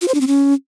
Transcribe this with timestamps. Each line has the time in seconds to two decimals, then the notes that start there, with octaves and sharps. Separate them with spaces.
0.02 F4
0.08 C5
0.14 D4
0.21 C4
0.27 C#4